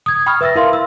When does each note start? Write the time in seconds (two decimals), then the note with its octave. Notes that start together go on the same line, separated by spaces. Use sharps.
0.06 D#6 G#6
0.26 G5 B5 C#6 D#6 F6
0.41 B4 E5 E6 A6 A#6
0.55 E4 A#4 E5 F5 C6
0.73 E6